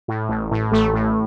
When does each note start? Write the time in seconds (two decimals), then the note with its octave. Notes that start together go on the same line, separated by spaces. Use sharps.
0.08 A2
0.29 A1
0.51 A2
0.72 A1 A3
0.93 A2